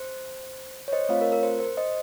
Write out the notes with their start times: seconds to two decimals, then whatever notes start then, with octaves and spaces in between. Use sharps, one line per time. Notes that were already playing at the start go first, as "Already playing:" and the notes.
Already playing: C5
0.88 C#5
0.92 C5 D#5
1.09 A3 C4 F4 C#5 F5
1.21 A#4
1.32 A#4
1.43 C5
1.60 C5
1.77 C5 D#5